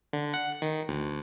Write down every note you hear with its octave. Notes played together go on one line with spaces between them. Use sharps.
D3
F#5
D#3
D2